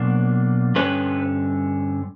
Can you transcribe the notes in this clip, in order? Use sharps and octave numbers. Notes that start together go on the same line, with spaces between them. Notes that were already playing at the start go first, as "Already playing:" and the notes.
Already playing: B2 F#3 A#3 D4
G2 D3 G3 C#4 B4